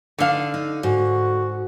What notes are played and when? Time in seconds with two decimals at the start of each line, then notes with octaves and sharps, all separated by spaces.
0.19 D3 D4 D#4 F5
0.54 D#4
0.83 G#2 F#4